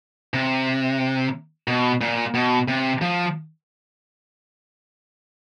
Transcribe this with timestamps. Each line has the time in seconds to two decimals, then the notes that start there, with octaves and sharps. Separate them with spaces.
0.34 C3
1.68 B2
2.01 A#2
2.34 B2
2.68 C3
3.02 F3